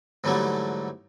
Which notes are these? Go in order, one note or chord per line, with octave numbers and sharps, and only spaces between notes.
G#2 D3 E3 F#3 G3 A3